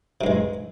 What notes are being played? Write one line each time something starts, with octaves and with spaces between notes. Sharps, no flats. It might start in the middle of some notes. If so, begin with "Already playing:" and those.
G2 C3 G#3